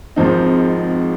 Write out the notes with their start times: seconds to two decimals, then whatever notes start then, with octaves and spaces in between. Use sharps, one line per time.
0.16 G#1 G#2 F3 C4 D#4